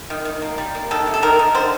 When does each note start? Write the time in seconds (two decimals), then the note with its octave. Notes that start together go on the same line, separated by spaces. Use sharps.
0.10 D#3
0.25 D#3
0.42 A#3
0.58 G3
0.75 A#3
0.91 D#3 A4
1.07 C3
1.14 A4
1.23 D#3 A#4
1.39 D#3
1.55 D3 C5